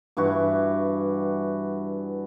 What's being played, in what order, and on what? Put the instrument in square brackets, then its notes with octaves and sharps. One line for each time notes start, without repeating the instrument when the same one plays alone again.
[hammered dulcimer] G2 E3 D4 F#4